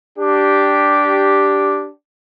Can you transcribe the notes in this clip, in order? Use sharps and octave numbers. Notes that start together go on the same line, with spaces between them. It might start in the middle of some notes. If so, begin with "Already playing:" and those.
D4 G4